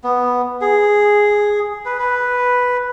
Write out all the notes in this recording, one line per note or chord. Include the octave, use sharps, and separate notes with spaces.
B3
G#4
B4
B4